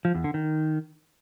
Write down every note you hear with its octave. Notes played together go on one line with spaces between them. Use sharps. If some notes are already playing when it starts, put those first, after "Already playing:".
F3
E2
D3
D#3